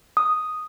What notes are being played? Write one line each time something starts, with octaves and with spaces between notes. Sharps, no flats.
D#6